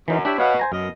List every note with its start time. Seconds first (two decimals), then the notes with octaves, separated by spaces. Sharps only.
0.08 F#2 E3 D#4
0.25 D4 E4 G4 C#5 D5 E5
0.38 B2 C#5 F5 F#5
0.59 C5 G#5 A#5
0.72 F#2 B2 A#4 D#5